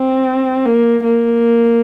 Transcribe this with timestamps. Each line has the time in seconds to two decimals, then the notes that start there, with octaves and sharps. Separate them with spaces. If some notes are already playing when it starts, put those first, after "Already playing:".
Already playing: C4
0.66 A#3
1.04 A#3